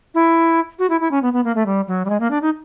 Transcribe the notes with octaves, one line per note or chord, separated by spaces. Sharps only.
E4
F#4
E4
E4
C#4
B3
B3
A#3
A3
G3
F#3
G3
G#3
A#3
D4
D#4